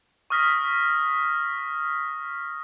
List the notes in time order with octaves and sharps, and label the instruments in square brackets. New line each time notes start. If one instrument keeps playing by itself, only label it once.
[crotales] C#6 D#6 F6 A#6 B6